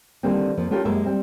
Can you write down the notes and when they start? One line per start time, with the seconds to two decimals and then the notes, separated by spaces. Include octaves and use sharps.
0.23 D3 D#3 G3 A#3 C4
0.57 F2 F3 A#3
0.71 A3 C#4 F4 G4 A4 A#4
0.85 F#2 G#3 A#3 G4 A#4 E5
1.06 G3 C4